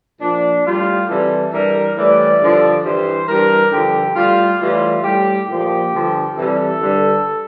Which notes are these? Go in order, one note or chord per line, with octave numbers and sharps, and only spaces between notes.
A#2 F3 D4
A2 G3 F4
C3 E3 G3 A4
G2 E3 G3 A#4
A2 E3 G3 D5
G2 D3 F3
G2 E3 G3 C5
G2 E3 G3 A#4
G2 D3 F3 G4
A2 G3 F4
A2 E3 G3 F4
A2 G3 G4
A#2 F3 G4
G2 D3 F3
C3 E3 G3 A4
G2 D3 G3